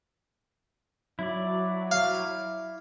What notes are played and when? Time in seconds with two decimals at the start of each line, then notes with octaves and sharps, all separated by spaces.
1.19 F#3 E4 D5
1.91 F5